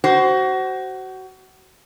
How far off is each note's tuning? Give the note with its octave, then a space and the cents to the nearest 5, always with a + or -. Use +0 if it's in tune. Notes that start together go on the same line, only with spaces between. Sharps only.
F#4 +25 C5 +0